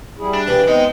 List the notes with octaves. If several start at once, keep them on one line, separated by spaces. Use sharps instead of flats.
G3 E4 G#4
D4
E3 A#3 G4
G#3 B3 C4 D#4